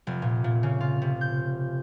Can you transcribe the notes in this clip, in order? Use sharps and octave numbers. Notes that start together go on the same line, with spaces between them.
F1
A#2
A#2
C#3
F4
C3
G6